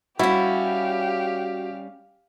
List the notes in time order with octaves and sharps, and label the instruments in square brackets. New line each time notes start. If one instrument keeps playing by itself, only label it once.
[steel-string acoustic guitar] G3 C#4 [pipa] E4 [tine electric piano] F#4 [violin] G4 F5